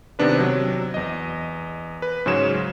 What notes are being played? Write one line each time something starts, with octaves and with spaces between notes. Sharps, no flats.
C3 D#3 B3 D4 B4
C3 F#3
E2 D#5
B4
G#2 C#3 F#3 G#3 C#5 E7